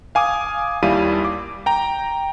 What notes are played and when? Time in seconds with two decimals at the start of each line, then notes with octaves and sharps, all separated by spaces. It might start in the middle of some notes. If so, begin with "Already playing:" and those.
0.15 F5 G#5 D6 D#6
0.82 D#2 G3 E4 F5 D#7
1.25 D6
1.66 G5 A#5